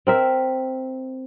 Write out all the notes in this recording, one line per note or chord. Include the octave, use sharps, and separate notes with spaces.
C4 A#4 E5